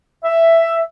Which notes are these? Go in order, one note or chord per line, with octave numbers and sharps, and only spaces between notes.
E5